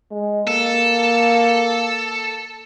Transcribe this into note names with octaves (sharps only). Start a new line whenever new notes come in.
G#3
A#3 A4